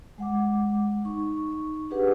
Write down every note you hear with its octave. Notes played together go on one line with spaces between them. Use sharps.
G#3 F#5 D6
D#4 C#6
D4 G4 G#4 B4 F#5